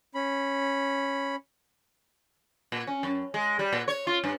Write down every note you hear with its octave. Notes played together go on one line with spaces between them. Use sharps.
C#4 B5
A#2
C#4
F#2
G#3
G3
A#2
C#5
F4
G2